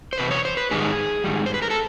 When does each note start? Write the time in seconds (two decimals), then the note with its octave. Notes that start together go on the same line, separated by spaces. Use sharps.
0.13 C5
0.18 E2 C3 B4
0.31 C#5
0.45 C5
0.57 B4
0.71 G#2 D#3 G3 G#4
1.24 G#2 D#3 G3
1.46 C5
1.54 B4
1.62 A#4
1.70 A4